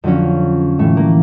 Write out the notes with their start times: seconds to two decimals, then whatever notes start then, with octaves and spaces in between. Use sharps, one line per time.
0.04 F2 D3 F#3 C#4
0.79 A2 E3 A3
0.97 A#3